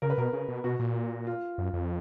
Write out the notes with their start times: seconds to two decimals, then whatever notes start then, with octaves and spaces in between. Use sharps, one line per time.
0.02 C#3 A#4
0.10 B4
0.18 B2 A#4
0.33 C#3
0.48 B2
0.64 B2 F#4
0.79 A#2
1.27 F4
1.58 F#2
1.73 F2